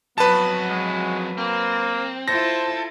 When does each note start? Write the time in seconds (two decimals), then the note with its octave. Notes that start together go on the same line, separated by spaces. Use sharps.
0.18 F2 F#3 B3 F#4 B4 A5
0.70 G#3
1.38 A#3 C4
2.28 E4 F4 A4 C5 A#6